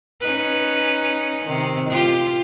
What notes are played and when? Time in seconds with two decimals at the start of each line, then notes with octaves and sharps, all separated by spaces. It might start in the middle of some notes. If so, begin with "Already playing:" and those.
0.21 C#4 D#4 B4
1.45 C3 D#3
1.90 F4 G4